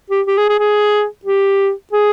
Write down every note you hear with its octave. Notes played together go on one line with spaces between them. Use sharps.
G4
G4
G#4
G#4
G#4
G4
G#4